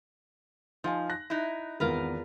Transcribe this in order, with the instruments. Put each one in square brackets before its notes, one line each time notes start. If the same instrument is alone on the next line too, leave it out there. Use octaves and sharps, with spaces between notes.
[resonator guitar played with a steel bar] F3 [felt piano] D#4 F5 G#5
[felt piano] F#6 A#6
[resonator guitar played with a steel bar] D#4 E4
[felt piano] G#1 E2 [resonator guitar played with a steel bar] F4 A#4 B4